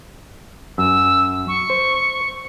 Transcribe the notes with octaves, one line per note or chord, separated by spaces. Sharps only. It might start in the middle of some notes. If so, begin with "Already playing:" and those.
F#2 E6
C#6
C5